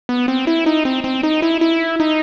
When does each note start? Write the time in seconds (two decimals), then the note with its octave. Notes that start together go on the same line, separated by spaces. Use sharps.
0.09 B3
0.28 C4
0.47 E4
0.66 D#4
0.85 C4
1.04 C4
1.23 D#4
1.42 E4
1.61 E4
2.00 D#4